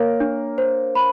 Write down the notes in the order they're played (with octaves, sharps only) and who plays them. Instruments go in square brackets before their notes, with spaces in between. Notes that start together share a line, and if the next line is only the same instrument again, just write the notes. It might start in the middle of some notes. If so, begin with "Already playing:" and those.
Already playing: [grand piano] A#3 A#4 [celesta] C#5
[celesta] D4
C5
B5